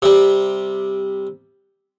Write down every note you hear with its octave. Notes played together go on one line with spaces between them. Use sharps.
C3 G3